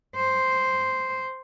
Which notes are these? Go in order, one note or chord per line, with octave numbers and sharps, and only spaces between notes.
C5